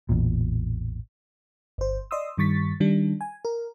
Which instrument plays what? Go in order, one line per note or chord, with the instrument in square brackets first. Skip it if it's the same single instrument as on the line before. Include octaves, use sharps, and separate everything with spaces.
[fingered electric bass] A1 E2 A#2
[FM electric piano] G1 C5
D5 D#5 C6 D#6 E6
G2 D#3 G3 C#6 A6 B6
D#3 G3 D4
G#5
A#4